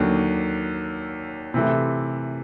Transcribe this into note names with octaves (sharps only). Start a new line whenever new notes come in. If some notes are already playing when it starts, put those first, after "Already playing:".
Already playing: D#2 D3 F#3
C3 E3 A3